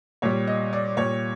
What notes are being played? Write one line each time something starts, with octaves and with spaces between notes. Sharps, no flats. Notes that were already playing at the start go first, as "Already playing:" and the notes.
A#2 G3 C#5
D#5
D5
A#2 G3 C#5